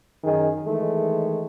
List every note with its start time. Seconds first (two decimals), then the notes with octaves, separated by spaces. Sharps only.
0.24 F#2 D#3 D#4 G#4
0.66 D#3 E3 G#3 A3